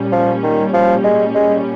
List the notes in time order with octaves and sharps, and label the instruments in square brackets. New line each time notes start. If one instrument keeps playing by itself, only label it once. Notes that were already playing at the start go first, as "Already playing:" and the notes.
Already playing: [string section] A#2 G3 C#4
[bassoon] F3
D#3
F3
G#3
G#3